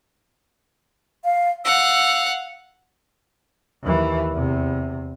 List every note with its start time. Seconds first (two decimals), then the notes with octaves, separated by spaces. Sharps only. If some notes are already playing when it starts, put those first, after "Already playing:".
1.24 F5
1.65 F5 F#5 E6
3.83 D#2 E3
4.33 E2 C3